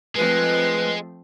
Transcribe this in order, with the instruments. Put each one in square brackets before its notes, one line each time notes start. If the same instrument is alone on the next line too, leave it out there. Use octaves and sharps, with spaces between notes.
[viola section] F3 A3 C4 [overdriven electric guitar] G#3 [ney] B4